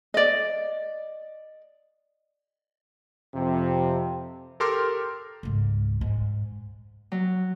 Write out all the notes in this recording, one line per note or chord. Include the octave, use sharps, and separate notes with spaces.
D5 D#5
F2 C3
G4 A4 A#4 C6 D6 F6
C#2 G#2
G#2
F#3